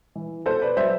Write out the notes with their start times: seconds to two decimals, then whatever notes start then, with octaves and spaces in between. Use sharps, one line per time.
0.15 E3
0.46 B2 A4 C5
0.62 B4 D5
0.77 F#3 C5 E5